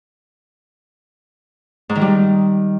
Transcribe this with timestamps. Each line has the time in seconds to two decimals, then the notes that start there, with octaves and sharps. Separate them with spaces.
1.89 G#2
1.95 D#3
2.01 G3